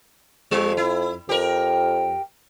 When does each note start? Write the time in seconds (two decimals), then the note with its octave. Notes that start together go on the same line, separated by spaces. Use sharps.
0.51 F2 G3
0.77 E4
1.29 F2 G4 A#4